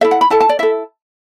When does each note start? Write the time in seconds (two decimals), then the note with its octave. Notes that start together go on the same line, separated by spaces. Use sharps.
0.01 E4 A4 E5
0.11 F#5
0.21 B5
0.30 E4 A4 A5
0.40 A5
0.49 D5
0.59 E4 A4 E5